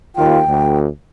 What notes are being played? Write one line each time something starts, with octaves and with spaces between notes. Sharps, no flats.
D#2 F4 G5
D2